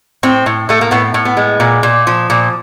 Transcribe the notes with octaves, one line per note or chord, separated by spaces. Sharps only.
A2 C4
A2
A2 A3
A#3
A2 B3
A2
B3
G#3
A#2
A#2
F3
A#2